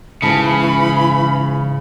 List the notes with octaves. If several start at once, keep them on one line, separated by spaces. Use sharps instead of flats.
G#2 C#3 E3 A5 B5